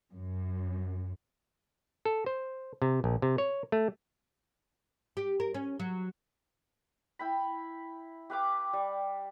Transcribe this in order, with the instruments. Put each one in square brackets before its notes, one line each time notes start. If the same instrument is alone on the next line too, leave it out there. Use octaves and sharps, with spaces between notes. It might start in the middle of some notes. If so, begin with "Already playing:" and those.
[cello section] F#2
[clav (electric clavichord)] A4
C5
C3
A#1
C3
C#5
A3
[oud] G4
A#4
C#4
F#3
[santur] E4 G5 B5
G4 B4 F5 D6
G3